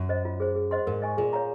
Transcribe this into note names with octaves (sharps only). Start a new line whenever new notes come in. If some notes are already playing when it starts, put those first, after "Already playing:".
Already playing: F#2
C5 D#5
F4
G#4 C5
G#4
C5 D#5 F#5 C6
G#2 A#4
D#5 G#5 C#6
A#2 G#4
C#5 F5 A#5